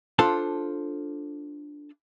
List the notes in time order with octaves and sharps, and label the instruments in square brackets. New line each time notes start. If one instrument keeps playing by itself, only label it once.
[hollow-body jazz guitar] D4 F4 A4 C5 A5